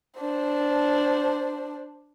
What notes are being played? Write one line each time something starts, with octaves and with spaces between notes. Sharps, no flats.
D4 C5